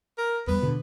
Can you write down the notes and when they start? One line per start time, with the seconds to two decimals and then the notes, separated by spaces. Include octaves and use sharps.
0.18 A#4
0.47 E2 G3 B3
0.62 B2 D3